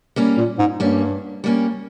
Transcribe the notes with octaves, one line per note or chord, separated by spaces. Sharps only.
G3 A#3 C#4
A#2
G#2
G2 G3 A#3 C#4
G3 A#3 C#4